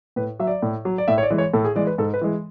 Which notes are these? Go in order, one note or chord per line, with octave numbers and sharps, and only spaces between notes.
A2 B4
F#3 E5
D5
A2
F#3
D5
A2 E5
C#5
D5
E3 G#3
C#5
A2 A4
G#4
E3 G#3 D5
B4
G#2 A4
B4
E3 G#3